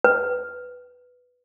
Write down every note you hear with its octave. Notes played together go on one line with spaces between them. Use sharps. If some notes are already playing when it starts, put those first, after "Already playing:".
B4